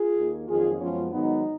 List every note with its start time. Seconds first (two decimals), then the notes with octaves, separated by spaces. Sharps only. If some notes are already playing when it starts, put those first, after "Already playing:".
Already playing: F4 G#4
0.17 D#2 D#3 A#3
0.49 F2 D#3 F#3 A#3 F4 G#4
0.80 F#2 F3 G#3 B3 C#4 F4
1.12 G#2 D#3 F#3 B3 D#4